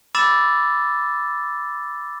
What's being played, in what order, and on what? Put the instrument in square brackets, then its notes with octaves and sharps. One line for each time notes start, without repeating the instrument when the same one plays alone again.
[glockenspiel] B5 D6 E6 A6 E7